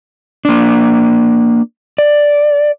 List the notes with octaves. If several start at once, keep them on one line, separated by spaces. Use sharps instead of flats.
A#3 D4
D5